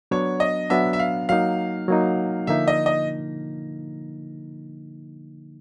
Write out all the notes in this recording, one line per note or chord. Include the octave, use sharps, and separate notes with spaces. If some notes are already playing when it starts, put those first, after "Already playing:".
F#3 B3 D4 C#5
D#5
F#3 B3 D4 E5
E5
F5
F#3 A#3 D#4 F5
F#3 A#3 D#4
D3 F3 A#3 D#4 E5
D#5
D#5